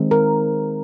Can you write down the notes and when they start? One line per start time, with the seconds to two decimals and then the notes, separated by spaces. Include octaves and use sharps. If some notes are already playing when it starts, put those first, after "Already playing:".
Already playing: D#3 G#3 C4
0.11 A#4